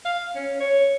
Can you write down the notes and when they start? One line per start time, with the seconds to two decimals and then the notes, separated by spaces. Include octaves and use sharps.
0.05 F5
0.35 C#4
0.60 C#5